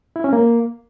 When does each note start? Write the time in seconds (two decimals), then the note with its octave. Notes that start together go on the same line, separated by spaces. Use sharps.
0.16 E4
0.24 C#4
0.33 A#3